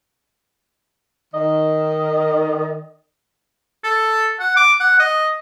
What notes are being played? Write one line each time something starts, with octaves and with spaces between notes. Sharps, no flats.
D#3 D#5
A4
F#5
D6
F#5
D#5